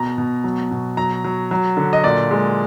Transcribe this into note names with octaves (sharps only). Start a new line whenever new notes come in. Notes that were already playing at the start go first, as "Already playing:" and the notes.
Already playing: B2 A#5
B2
F#3
B2
F#3 A#5
F#3
F#3
D3
D#5
A#2 D5
G#3